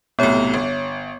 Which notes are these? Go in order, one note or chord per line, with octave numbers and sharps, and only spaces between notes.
B1 A2 C3 B3 C#5
G1